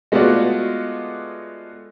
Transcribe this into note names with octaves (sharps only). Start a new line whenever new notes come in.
G#3 A3 B3 F4 F#4 D5